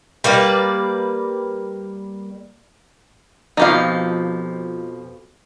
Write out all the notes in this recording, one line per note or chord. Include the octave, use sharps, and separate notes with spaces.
G3 A#3 B4 D5
F2 B2 F3 D#4 G4 F5